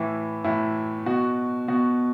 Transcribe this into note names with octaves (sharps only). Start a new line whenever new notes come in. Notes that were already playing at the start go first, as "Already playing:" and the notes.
Already playing: A2 E3 E4
A2 E3 E4
B2 F#4
B2 F#4